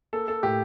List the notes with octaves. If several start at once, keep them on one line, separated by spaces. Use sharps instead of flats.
A#3 A4
A4
A2 G4